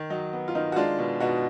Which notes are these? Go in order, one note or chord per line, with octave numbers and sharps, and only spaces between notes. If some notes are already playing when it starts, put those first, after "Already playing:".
Already playing: D#3
F#3 D#4
B3
F4
D#3 D#4
F#4
G#3 D4 F4
B2
B2 D#4 F#4